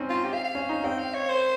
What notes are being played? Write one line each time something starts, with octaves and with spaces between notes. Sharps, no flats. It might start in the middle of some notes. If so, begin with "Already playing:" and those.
Already playing: C4 C#4 D#4
F4
G4
F5
F5
C#4
D#4
C4 G5
F5
C#5
C5